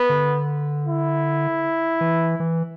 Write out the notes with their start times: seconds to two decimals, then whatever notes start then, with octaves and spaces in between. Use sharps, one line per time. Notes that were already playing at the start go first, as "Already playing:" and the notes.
Already playing: B3
0.09 D3
0.87 E4
2.01 E3
2.40 E3